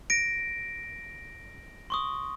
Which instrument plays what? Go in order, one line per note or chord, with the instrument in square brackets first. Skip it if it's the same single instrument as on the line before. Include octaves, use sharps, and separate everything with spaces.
[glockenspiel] A#6 D7
C6 C#6 D#6